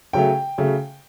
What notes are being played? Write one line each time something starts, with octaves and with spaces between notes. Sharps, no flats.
C#3 F#3 A3 G5
C#3 F#3 A3